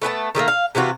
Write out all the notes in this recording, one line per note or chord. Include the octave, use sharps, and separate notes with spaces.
A3 B3 G#5 A5
D#3 G3 A3 A#3
F5
C3 E3 F4 F#4